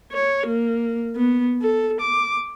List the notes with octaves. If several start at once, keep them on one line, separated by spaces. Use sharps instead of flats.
C#5
A#3
B3
A4
D6